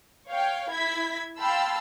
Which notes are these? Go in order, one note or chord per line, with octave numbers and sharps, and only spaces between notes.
C#5 F5 G5
E4 G#6 B6
F5 G5 A5 B5 C6 E6